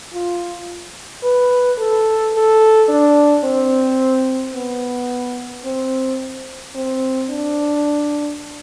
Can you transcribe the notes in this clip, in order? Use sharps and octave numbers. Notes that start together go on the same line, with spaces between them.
F4
B4
A4
A4
D4
C4
B3
C4
C4
D4